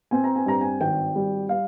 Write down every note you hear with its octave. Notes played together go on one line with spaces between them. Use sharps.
C4 G#5
A#5
G#5
G2 A#5
G#5
G#1 G5
G3
F5